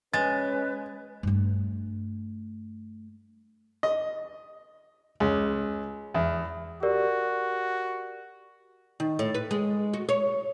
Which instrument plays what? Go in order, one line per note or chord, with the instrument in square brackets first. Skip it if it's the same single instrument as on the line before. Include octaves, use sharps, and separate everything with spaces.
[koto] G#3 [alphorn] C#4 [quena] B4 [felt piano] A6
[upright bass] G2 A3
[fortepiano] D#5
C#2
E2
[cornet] F#4 [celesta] G4 A#4 D5
[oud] D#3
A2
B4
G#3
F#4
C#5